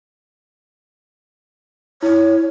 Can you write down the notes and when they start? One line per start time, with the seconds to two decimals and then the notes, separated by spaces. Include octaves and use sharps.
2.03 E4 C#5